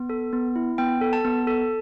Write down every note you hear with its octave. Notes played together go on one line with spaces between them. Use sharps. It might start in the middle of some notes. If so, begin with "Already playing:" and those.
Already playing: B3
A4
B3
E4
B3 G5
A4
A5
B3
A4